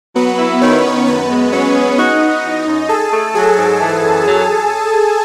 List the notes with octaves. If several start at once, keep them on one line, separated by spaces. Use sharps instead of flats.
F#3 B3 B4
E4
D#3 C#4 C#5
D#3
F#2 B3 B4
G#3
F#3 C#4 C#5
G#4
D#4 F#4 D#5
B3
E3
F#2
G#4 A4 A5
A3
F#3 G#4 G#5
G#2
E3
F#2
F#3